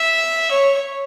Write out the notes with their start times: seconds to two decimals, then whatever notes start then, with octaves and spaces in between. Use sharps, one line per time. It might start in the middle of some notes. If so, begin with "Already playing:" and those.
Already playing: E5
0.51 C#5